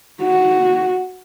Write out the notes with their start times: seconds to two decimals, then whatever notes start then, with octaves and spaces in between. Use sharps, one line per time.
0.22 F#4